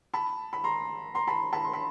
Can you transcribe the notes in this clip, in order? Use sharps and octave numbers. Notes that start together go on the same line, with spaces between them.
A5 B5
B5
A#5 C6
A#5 C6
A5 B5
A5 B5
C6
B5